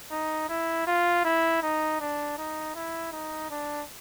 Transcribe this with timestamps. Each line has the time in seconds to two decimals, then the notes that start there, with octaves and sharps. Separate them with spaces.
0.11 D#4
0.49 E4
0.87 F4
1.24 E4
1.62 D#4
2.00 D4
2.38 D#4
2.75 E4
3.12 D#4
3.50 D4